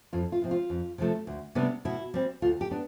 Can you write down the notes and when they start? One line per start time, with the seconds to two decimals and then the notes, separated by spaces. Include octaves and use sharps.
0.13 F2 F4
0.32 F4
0.41 C3 F3 C4
0.51 F4
0.70 F2
0.98 C3 F3 A3
1.27 D2
1.55 C3 G3 B3 D4
1.85 B2 E4
2.14 G3 C4
2.42 D2 F4
2.61 G4
2.71 B3 D4